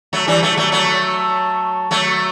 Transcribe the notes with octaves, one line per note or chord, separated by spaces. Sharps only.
F#3 A3
E3 G3
F#3 A3
F#3 A3
F#3 A3
F#3 A3